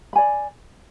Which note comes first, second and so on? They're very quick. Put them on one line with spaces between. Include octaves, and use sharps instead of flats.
B5 G#5 D5